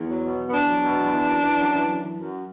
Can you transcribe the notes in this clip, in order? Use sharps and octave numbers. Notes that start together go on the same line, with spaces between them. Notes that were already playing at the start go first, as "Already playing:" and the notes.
Already playing: E2
F#3
B2
E2
B3
E2 D4
F#3
B2
E2
E3
F#2
E3
F#2
E3
F#2
E3
F#2